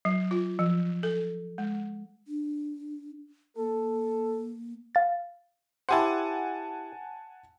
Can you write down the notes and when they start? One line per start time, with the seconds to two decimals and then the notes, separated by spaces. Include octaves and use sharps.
0.05 F#3
0.31 F4
0.59 F3
1.03 A4
1.58 G#3
2.28 D4
3.57 A#3 A4
4.95 F5 A6
5.89 E4 G4 C5 F#5 G#5 A5